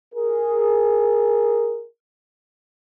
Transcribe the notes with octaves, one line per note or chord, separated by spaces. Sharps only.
G#4 A#4